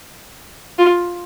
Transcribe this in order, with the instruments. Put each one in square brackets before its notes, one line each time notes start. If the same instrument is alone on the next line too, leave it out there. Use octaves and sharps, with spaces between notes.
[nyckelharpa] F4